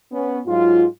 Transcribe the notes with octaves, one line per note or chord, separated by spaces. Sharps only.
B3 C#4
G#2 F#3 F4